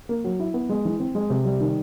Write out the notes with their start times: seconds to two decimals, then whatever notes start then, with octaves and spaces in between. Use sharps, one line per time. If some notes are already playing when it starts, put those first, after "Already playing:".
0.09 A#3
0.24 F#3
0.40 E4
0.54 B3
0.69 G#3
0.85 E3
1.00 C4
1.15 G#3
1.30 C3
1.45 G3
1.61 D#3